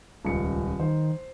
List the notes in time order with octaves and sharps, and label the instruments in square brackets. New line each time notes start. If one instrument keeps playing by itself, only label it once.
[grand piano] D#1 C#2 C#7
[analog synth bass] D#3 [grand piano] C5